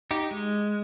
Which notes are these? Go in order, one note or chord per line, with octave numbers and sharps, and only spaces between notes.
D#4 G4
G#3